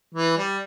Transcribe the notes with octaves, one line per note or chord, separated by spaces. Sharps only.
E3
G3